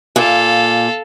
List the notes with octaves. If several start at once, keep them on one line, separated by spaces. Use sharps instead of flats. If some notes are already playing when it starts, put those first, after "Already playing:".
A#2 A4 F5